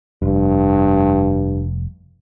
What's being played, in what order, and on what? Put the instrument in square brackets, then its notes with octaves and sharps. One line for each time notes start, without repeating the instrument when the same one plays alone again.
[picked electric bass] F1 [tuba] G2